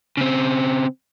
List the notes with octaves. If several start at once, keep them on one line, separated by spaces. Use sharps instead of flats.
C#3 C4